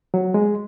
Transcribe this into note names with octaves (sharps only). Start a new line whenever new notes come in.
F#3
G#3